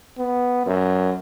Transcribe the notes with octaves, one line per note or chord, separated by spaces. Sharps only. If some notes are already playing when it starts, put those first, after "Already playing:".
B3
F#2